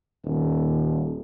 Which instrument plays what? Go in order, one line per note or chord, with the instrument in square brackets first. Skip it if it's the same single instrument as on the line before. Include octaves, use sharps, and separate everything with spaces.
[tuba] D#1